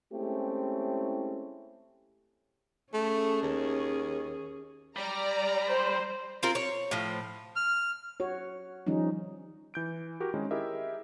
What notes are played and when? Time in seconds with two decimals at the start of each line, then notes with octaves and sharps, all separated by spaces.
0.13 G#3 A3 C4 C#4 E4 G4
2.93 A3 C#4 G#4
3.43 D#2
4.96 G3 D5 A#5
5.69 C5
6.43 C4 F4 A#4
6.55 C#5
6.91 A2 F3
7.56 F6
8.20 F#4 C#5
8.87 D#3 F3 G3 C#4 D#4
9.74 E3 G6 D7
10.20 F#4 G4 A#4
10.34 D#3 G#3 C4 C#4 D#4 E4
10.51 E4 G4 G#4 A#4 D#5 E5